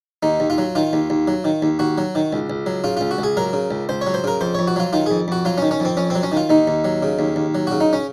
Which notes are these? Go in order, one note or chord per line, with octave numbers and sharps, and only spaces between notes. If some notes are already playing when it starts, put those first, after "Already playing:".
D#2 D#4
D#2
F4
F#3
D#3 F4
D#2
D#2
F#3
D#3
D#2
D#2 F#4
F#3
D#3
C#2
C#2
F#3
C#3 F4
C#2 F4
F#4
C#2 G#4
F#3 A#4
C#3
C#2
C#2 C5
C#5
F#3
C5
C#3 A#4
F2 C5
F2 C#5
F#4
F#3 F4
D#3 F4
F2 G#4
F2 F#4
F#3 F4
D#3 C#4
C#4
F2 C4
F2 C#4
F#3 C4
C#4
D#3
F4
D#2 D#4
D#2
F#3
C#3
D#2
D#2
F#3
C#3 F#4
D#4
C#4